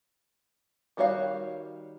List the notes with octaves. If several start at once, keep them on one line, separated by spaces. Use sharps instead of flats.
D#3 G3 F#4 C#5 F5